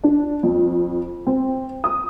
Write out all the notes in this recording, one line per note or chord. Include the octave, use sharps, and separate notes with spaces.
D4
F2
C4
D#6